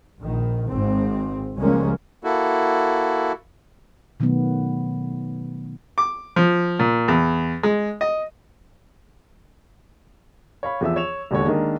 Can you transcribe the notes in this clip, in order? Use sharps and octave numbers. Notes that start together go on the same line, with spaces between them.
A#1 D#3
G#1 G#2 C4
C#2 F3 G3 G#3 A#3 C#4
A#3 E4 F#4 A4
B2 D#3 F#3 A3 B3
D6
F3
A#2
E2
G#3
D#5
C#5 F5 B5
E2 F3 E5 E6
C#5 E7 F7
E1 D#2 D3 C#5
D#3 G#3 A#3 D4 A#4 D#5